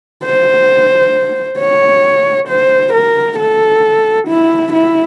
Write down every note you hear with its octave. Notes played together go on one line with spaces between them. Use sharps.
C5
C#5
C5
A#4
A4
E4
E4